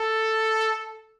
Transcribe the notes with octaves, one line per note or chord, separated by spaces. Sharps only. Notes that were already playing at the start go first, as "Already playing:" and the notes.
Already playing: A4